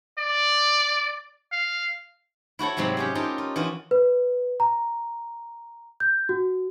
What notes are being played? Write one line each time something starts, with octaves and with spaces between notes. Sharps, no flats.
D5
F5
E4 F#4 A4 C#5
G#2 C3 F#3 G#3 C4
C#4 G4 G#4
D#4 F4 G4 A4 A#4
F4
E3 D#4 F4 F#4
B4
A#5
G6
F#4